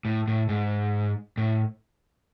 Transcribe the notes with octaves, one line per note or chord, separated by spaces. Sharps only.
A2
A2
G#2
A2